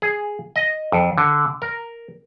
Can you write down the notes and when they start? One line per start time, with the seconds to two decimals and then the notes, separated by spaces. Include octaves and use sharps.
0.02 G#4
0.56 D#5
0.92 F2
1.18 D3
1.62 A#4